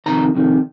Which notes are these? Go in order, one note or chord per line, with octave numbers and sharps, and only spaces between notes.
F2 C3 D#3 A#5
F2 C3 D#3